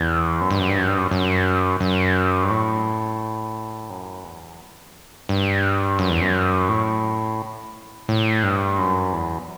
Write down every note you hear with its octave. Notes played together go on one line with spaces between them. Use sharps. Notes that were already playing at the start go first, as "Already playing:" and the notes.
Already playing: E2
F#2
G2
F#2
G2
F#2
G2
F#2
F#2
F#2
G2
A2
F#2
E2
G2
F#2
E2
F#2
A2
A2
G2
F#2
E2